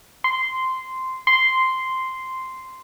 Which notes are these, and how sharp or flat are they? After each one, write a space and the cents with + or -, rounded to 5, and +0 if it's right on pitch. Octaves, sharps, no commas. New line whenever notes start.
C6 -10
C6 -5